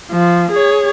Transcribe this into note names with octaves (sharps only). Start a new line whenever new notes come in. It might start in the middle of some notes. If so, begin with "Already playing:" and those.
F3
G#4 C#5